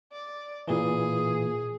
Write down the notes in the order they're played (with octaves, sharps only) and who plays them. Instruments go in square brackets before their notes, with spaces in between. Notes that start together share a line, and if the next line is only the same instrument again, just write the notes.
[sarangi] D5
[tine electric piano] A#2 E3 [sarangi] G#4